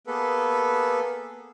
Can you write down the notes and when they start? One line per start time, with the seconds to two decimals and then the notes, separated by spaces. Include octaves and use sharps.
0.07 A#3 B3 G#4 A4 B4